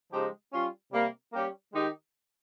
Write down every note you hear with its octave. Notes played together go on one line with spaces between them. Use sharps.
C#3 F3 G#3 D#4 G4
G3 C#4 F4
C3 G3 A#3
G3 A#3 C#4 G4
D#3 G#3 D#4 G4